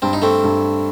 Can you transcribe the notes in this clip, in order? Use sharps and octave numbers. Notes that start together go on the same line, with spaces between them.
G2 C4
D#4
A3 C4
G2